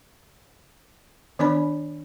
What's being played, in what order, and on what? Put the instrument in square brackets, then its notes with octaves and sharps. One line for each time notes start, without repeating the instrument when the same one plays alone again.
[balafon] D#3 B3 D4 D5 B5